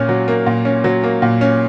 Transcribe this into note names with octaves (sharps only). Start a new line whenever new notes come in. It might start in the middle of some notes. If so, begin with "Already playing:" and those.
Already playing: A#2 A#3 C#4
F#3
A#3
A#2
C#4
F#3
A#3
A#2
C#4